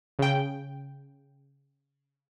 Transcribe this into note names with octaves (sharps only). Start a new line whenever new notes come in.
C#3 G5